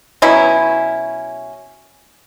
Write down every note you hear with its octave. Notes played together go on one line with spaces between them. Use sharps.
B2 F#3 C#4 E4